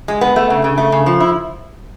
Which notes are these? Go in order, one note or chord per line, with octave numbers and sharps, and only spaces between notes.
G#3
B3
A3
C#3
C#3
A3
C#3
F3
E4